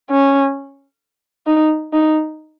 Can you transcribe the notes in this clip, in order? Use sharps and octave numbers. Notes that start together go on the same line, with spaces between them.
C#4
D#4
D#4